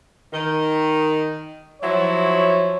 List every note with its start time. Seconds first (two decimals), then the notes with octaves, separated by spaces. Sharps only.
0.33 D#3
1.82 F3 F#3 E4 C#5